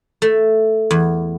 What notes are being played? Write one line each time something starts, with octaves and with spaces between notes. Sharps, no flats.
A3
E2